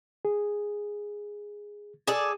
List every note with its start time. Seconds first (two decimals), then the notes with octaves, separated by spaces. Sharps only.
0.25 G#4
2.07 G#4 A4 D5